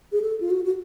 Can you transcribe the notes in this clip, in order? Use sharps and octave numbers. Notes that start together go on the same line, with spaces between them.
G#4
A4
F4
F#4
F#4